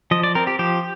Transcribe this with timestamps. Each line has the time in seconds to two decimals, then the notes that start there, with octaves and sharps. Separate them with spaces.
0.11 F3 D#5
0.23 D5
0.35 C4 A#4
0.47 G4
0.59 F3 G4